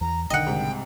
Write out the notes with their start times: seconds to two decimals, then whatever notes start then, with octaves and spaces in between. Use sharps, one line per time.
0.01 E2 A#5
0.30 B1 D3 D#3 D#5 F#5 G5
0.46 C2 G#2 C3